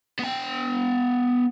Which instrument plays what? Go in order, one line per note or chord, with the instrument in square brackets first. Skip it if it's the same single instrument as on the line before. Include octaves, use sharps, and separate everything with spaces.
[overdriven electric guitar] B3 G5